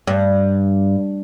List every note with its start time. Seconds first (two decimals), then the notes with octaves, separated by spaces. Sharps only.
0.07 G2